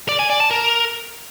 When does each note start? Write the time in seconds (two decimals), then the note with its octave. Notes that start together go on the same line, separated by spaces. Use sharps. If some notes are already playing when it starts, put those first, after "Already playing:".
0.09 D5
0.19 G#5
0.30 D5
0.40 A5
0.51 A#4